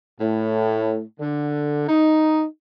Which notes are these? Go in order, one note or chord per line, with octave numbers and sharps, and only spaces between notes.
A2
D3
D#4